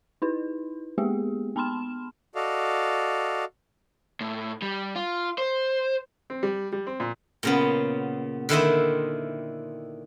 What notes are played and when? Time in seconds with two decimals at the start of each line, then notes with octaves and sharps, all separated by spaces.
0.22 D#4 E4 B4
0.98 G#3 A#3 B3 G4 G#4
1.56 B3 A5 B5 C6 F6 E7
2.35 F#4 A4 D5 D#5 F5
4.20 A2
4.62 G3
4.95 F4
5.38 C5
6.30 C4
6.43 G3
6.72 G3
6.87 C4
7.00 A#2
7.43 A#2 C#3 B3
8.49 D3 D#3 E4 C5 D#5 E5